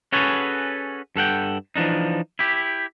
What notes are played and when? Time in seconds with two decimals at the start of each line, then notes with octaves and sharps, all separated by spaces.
0.12 C#4 F#4 G#4 A4 B4 C#5
1.16 G2 A4 F#5 G5
1.76 E3 F3 A3 D4 D#4
2.39 E4 G4